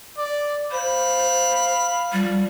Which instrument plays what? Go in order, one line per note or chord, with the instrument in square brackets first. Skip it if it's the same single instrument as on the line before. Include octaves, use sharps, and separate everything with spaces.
[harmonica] D5
[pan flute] C5 [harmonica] F5 B5
[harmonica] F3 [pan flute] G3